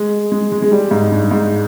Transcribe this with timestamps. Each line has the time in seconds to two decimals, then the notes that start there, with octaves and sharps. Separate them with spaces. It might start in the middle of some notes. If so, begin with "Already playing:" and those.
Already playing: G#3
0.32 G#3
0.52 G#3
0.62 G#3
0.72 G3
0.91 G#2
1.11 G2
1.31 G#2